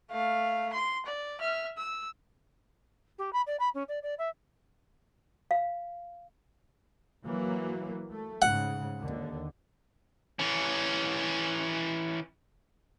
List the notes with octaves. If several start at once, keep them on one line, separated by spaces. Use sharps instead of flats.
A3 F5
C6
D5
E5 F6
E6
G4
B5
D5
B5
C#4
D5
D5
E5
F5
E3 F#3 A#3
A3
G#2 C#3 F#5
D#2 D3
E3 C#4